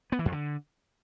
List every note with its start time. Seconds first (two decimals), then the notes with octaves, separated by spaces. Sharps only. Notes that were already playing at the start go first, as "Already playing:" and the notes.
0.12 B3
0.19 E3
0.26 F2
0.32 D3